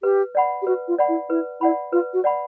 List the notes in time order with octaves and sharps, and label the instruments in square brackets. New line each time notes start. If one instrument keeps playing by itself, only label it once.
[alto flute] G4 [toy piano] B4
[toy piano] D5 F#5 B5
[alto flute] G4
[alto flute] F#4 [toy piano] B4
[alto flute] F4
[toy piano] D5 F#5 B5
[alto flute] E4
[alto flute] E4 [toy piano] B4
[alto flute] E4 [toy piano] D5 F#5 B5
[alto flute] F4 [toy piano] B4
[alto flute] F#4
[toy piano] D5 F#5 B5